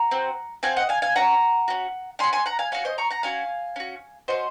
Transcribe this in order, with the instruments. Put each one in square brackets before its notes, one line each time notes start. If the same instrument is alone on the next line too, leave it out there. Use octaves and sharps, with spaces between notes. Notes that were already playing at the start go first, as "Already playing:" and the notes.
Already playing: [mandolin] F#5 A#5
C4 F#4
C4 F#4 F5 G#5
D#5 F#5
F5 G#5
F5 G#5
C#4 F#4 F#5 A#5
C#4 F#4
C#4 F#4 G#5 C6
G#5 C6
F#5 A#5
F5 G#5
C#4 F#4 C#5 F5
C5 D#5
A#5 C#6
F#5 A#5
C#4 F#4 F5 G#5
C#4 F#4
C#4 F#4 C5 D#5